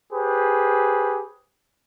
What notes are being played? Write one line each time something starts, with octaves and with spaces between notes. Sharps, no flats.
G4 G#4 B4 C5